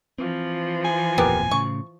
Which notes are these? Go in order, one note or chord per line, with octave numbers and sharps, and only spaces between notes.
E3 F3 C4
G#5
D1 F2 A#2 B3 G4 A#4
A2 C#3 C#6